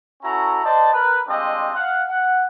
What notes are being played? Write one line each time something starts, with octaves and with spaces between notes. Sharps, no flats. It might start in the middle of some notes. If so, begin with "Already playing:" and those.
C#4 E4 F#4 A4 A#5
C5 D5 D#5 A5
A#4 B4
G3 G#3 C4 D4 F4 D#5
F5 F#5
F#5